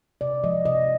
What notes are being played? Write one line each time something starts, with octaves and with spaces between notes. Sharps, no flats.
C3 D5
F3 G#3 D#5
C3 D#5